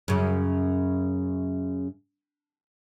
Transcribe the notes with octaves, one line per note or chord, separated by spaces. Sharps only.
F#2 C#3